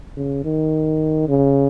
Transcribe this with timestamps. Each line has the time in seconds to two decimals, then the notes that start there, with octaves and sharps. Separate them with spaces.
0.17 C#3
0.44 D#3
1.28 C#3